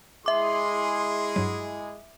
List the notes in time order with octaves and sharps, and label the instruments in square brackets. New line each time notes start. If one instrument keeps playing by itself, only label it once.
[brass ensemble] G#3 E4 G#4 [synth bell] E5 D6 [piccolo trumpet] C6
[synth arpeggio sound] G2 F#3